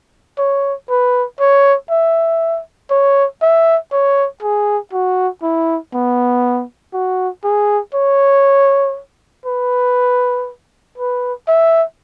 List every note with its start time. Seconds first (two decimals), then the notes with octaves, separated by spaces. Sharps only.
0.38 C#5
0.90 B4
1.40 C#5
1.90 E5
2.90 C#5
3.42 E5
3.92 C#5
4.43 G#4
4.93 F#4
5.43 E4
5.93 B3
6.93 F#4
7.44 G#4
7.95 C#5
9.46 B4
10.98 B4
11.48 E5